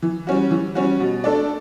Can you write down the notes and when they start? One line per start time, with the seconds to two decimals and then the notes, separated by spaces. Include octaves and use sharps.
0.02 E3
0.27 G3 C#4 F#4
0.51 E3
0.75 G3 C#4 F#4
1.00 B2
1.24 A3 D4 A4 D5